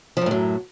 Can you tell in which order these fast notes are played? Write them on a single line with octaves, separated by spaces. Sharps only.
F3 F#2 A2 F#3